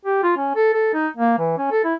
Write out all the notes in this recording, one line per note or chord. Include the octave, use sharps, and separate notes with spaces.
G4
F4
C#4
A4
A4
D#4
A#3
E3
C#4
A4
E4